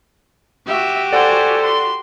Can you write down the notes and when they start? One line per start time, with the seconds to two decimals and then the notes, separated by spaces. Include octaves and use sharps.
0.67 F#4 G4 E5
1.13 A4 C5 D5 F#5 G#5
1.63 C6